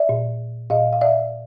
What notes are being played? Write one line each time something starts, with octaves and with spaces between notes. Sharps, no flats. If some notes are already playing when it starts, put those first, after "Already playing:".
Already playing: D5 E5
A#2
A#2 D#5 F5
F5
D5 E5